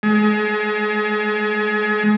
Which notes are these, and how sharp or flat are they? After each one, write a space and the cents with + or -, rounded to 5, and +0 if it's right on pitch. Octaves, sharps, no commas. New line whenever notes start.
G#3 +30